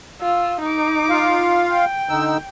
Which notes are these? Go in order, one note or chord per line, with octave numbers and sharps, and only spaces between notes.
F4 E6
D#4 D6
F4 F5
G5
D3 D#4 E6